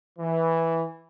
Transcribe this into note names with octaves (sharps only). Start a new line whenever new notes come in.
E3